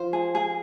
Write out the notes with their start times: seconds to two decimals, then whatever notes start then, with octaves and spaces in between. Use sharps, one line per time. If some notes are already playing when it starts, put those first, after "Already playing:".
Already playing: F3 F4 C5
0.13 G#4
0.35 G#4